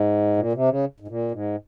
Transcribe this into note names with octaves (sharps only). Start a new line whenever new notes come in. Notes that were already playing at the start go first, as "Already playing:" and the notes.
Already playing: G#2
A#2
C3
C#3
G#2
A#2
G#2